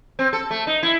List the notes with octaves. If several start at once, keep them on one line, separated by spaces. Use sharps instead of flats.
C4
A4
A3
D#4
E4